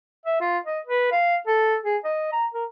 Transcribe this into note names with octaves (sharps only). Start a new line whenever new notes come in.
E5
F4
D#5
B4
F5
A4
G#4
D#5
A#5
A#4